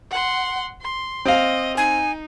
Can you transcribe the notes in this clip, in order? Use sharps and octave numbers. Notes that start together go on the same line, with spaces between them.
F#5 C6
C6
C4 D#5 F5
D#4 G#5